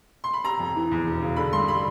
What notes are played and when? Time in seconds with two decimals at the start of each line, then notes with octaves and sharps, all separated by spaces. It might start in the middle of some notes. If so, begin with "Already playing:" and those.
0.24 C6
0.33 B5
0.44 C3 A#5
0.59 F2
0.76 E3
0.91 E2
1.06 E1
1.21 C#3
1.36 D3 B5
1.52 G2 C6
1.68 G3 B5